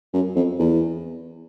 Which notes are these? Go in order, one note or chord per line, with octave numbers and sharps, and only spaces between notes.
F#2
F2
E2